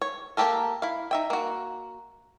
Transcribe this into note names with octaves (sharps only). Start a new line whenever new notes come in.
C#5
A#3 C4 G4 A4 A#4
E4 F5
D#4 E5 G5
A#3 F#4